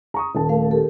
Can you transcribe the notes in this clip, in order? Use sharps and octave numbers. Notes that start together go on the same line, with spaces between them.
A#5 C#6 D#6
D#1 A5
A3 A#4 F5
G4 A4 A#4